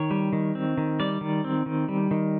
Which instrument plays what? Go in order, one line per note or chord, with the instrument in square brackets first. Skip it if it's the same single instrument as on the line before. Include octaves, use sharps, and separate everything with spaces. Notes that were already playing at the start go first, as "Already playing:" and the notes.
Already playing: [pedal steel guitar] D#3 C#5
G3
D#3
C4
D#3
G3 D5
D#3
C4
D#3
G3
D#3